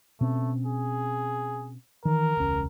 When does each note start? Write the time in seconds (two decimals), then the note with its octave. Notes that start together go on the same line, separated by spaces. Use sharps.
0.21 B2 A3 C4 C#4
0.67 G#4
2.05 D#3 E3 A#4
2.37 E1 C#2 C#4